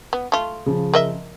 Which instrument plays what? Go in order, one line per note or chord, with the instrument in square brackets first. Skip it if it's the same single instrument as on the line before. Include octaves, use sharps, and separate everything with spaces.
[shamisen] B3
A3 F4
[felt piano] C#3 F3
[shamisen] A#4 D#5 E5